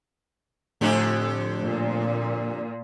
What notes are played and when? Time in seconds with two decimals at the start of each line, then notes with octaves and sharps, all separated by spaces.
0.81 F2 A2 D3 A3 G4
1.61 A#2